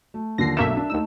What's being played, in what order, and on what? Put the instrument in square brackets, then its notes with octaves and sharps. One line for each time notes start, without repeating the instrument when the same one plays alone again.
[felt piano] A3
[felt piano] D#2 D3 F3 [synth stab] A#6 C7
[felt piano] B1 D4 E7 [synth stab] A3 A#3 E5
[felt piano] D4
[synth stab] D#2 E6 [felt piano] A3 D#4